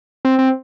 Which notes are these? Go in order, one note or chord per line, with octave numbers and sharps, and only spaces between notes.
C4
C4